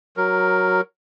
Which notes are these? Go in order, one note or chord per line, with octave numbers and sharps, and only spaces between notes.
F#3 A#4